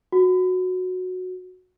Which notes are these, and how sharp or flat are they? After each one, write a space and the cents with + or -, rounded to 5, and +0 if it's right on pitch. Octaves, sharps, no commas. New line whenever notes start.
F#4 -10